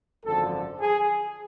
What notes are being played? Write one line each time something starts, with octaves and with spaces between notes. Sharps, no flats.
G#1 F#2 D3 F3 A4
G#4